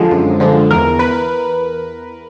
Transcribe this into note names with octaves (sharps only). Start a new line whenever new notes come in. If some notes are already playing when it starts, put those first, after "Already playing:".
Already playing: D3 F3 G#3
F#2
D3 F3 G#3
E2 A#4
B4